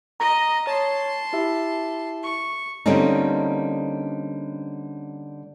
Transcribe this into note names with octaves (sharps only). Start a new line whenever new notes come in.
D#5 A#5 A#6
C#5 A5 C6
E4 G4 E5
C#6
D3 G3 A#3 C4 C#4 D#4